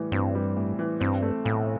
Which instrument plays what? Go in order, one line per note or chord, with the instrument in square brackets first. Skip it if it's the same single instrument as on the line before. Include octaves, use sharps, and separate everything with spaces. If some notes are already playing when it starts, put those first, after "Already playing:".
Already playing: [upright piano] A2 E3 G3
[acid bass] G2 [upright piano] C4
[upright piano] G3
A2
E3
[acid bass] G2 [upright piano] C4
[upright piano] A3
[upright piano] B1 [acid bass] A2